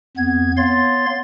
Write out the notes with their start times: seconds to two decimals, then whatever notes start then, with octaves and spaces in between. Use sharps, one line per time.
0.17 F2 B3 G#6
0.57 B3 C#5 F5 C6 A6